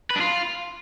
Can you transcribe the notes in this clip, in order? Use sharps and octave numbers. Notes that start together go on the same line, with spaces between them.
B4
D4
F4